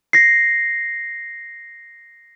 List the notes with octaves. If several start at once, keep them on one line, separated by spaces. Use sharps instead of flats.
A#6 C7